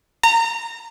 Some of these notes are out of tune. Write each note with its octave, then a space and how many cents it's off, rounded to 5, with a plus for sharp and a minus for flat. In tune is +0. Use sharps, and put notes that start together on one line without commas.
A#5 -25